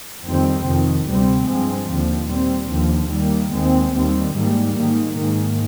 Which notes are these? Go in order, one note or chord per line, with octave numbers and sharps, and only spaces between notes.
F2 D#3 G3 C4
F2 C3 D#3
D2 C3 G3 C4
G2 F3 G#3 C4
D#2 D3 F3
A#2 G3 C4
D#2 D3 F3
D#2 D#3 G3 A#3
D#2 D#3 G#3 C4
D#2 D#3 G3 C4
G#2 D#3 G3 A#3
G#2 D#3 A#3
G#2 D#3 A#3